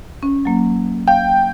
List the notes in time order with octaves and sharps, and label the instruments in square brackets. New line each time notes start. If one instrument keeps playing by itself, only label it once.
[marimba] C#4
F#3 A#3
[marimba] F5 [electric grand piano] G5